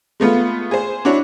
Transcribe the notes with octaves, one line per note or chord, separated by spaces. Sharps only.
G#3 A3 B3 F4
G#4 C5
D4 E4 F#4 C#5